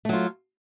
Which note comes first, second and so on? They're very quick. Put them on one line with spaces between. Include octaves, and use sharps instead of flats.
A3 F#3 F4